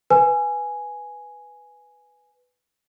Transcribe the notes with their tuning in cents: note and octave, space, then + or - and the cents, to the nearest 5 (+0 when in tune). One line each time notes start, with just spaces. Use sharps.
B4 +0 G#5 +0